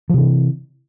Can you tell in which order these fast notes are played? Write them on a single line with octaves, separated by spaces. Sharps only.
F3 C3 E3